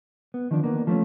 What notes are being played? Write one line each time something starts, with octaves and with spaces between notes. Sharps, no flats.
B3
D#3 F3 D4
A#3 B3
F3 A3 C4 C#4